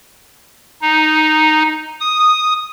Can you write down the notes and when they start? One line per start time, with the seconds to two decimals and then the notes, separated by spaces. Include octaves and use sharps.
0.82 D#4
2.00 D#6